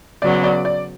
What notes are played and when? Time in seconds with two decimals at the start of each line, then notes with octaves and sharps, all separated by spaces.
0.22 C#3 F#3 B3 D5
0.44 D5
0.65 D5